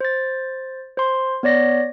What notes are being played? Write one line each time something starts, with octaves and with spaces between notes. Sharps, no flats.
C5 A6
C5 C6
B3 C#5 D5 A#6